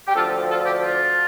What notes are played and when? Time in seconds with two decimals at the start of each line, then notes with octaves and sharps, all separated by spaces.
0.07 G4
0.15 D2 D3 F3 F4 A4
0.49 F4 A4
0.66 G4
0.83 F4